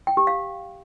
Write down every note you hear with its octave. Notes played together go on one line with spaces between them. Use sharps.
G5
G4
F5